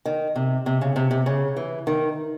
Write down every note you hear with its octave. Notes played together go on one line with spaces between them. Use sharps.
D#3
C3
C3
C#3
C3
C3
C#3
E3
D#3